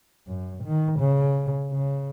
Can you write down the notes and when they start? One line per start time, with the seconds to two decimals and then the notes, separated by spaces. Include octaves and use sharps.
0.28 F#2
0.63 D#3
0.99 C#3
1.72 C#3